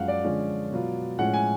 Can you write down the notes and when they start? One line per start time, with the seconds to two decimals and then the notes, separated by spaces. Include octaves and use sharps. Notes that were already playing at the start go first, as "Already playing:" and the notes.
Already playing: F#2 F3 G#3 F5 F#5
0.08 D5
0.24 D3 F3 G#3 C#4 F4
0.71 B2 F#3 B3 F4
1.18 A2 F3 G#3 C#4 F#5
1.34 G#5